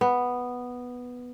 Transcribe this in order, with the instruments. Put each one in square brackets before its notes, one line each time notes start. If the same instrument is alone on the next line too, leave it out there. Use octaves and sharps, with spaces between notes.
[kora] B3